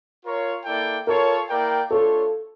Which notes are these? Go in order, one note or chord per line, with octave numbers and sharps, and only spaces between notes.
F4 A#4 C#5
A#3 E4 A4 D5 G5
F4 A4 A#4 C#5
A#3 E4 A#4 D5 G5
A3 D4 F4 A4 C#5